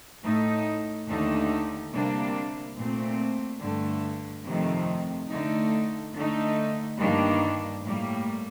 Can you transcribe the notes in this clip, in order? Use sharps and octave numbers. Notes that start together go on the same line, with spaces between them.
A2 A3 D#4
D#2 D3 A3 D#4
C3 G3 A#3 D4
A#2 A3 C4
G2 D3 A3
F2 C3 D#3 A3
D3 A3 D#4
D3 A3 D#4
G2 D#3 G3 A#3 D4
A2 G3 A#3